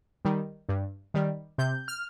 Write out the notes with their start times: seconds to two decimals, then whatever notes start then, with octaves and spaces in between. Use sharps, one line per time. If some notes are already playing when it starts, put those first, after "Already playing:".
0.25 D#3 G3
0.69 G2
1.14 D#3 G3
1.58 C3 G6
1.88 F6